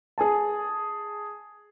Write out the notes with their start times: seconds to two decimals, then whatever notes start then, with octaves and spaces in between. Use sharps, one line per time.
0.18 G#4 G#5 A5